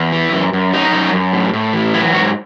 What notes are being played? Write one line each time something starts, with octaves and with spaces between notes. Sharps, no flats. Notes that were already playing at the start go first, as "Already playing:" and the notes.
Already playing: E2
E3
F#2
F#2
F#3 D#4
F#2
F#2
A2
A2
E3
F#3 E4
G#2 F#4